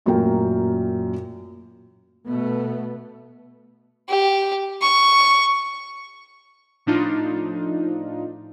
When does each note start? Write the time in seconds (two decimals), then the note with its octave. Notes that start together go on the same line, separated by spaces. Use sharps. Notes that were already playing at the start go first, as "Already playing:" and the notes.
0.06 A1 F#2 A#2 A#3 A#4 G5
2.28 B2 A3 B3
4.08 G4
4.81 C#6
6.86 A2 F3 D4 D#4 F4